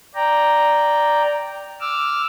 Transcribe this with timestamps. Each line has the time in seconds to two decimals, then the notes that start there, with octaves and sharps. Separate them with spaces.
0.15 D5 G5 A#5
1.80 D6 E6 F6